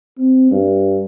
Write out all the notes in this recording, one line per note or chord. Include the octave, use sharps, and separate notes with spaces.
C4
G2